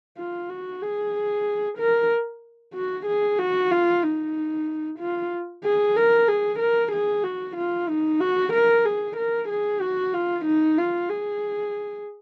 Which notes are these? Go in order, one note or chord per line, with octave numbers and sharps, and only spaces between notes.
F4
F#4
G#4
A#4
F#4
G#4
F#4
F4
D#4
F4
G#4
A#4
G#4
A#4
G#4
F#4
F4
D#4
F#4
A#4
G#4
A#4
G#4
F#4
F4
D#4
F4
G#4